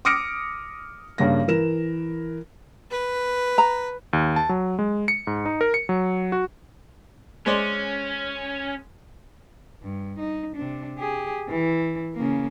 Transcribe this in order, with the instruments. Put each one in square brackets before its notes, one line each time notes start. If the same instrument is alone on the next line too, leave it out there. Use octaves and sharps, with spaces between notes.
[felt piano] D6 D#6 F6 A#6 C#7 D7
G2 C#3 A#3 A#6
E3 A#4 E7
[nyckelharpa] B4
[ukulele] A#5
[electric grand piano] D#2
A5
F#3
G#3
C#7
G#2
D#4
A#4
C#7
F#3
F#4
[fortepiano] G#3 C5 D5 [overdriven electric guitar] C#4
[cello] G2
D#4
C3 D4
G4 G#4
E3
C#3 A#3